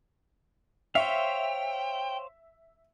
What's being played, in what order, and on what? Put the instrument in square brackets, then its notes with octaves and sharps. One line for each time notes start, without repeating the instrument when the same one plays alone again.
[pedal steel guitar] C5 C#5 F5 [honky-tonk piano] E5 [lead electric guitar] G5